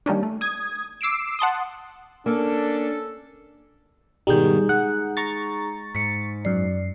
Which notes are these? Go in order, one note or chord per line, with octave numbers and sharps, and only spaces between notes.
D#3 G3 A#3 C#4 D4
A3
D#6 G#6
D6 E6 C7 D7 E7
F#5 A5 C6 D#6
A#3 C#4 D4 A4
G#2 B2 D#3 G3 D#4 G#4 G6
G#3 F#5
A#5 C#6 A6
G#2 B6 C#7
F#2 D5 C7